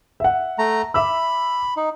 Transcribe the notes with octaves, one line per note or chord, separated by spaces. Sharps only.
E5 F#5
A3 A#5
E5 B5 D6 E6
D#4